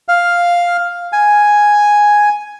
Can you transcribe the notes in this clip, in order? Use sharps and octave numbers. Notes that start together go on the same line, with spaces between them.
F5
G#5